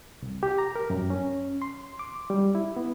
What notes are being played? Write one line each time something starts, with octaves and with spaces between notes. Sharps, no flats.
C2
G4
A#5
A#4
F#2
C#4
C6
D6
G3
E4
B3